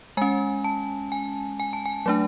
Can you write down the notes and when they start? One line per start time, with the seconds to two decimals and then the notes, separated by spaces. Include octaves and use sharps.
0.17 G#3 C#4 G#5
0.64 A5
1.12 G#5
1.60 G#5
1.73 A5
1.86 G#5
2.06 F#3 A3 D4